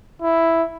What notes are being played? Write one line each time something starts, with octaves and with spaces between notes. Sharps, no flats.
E4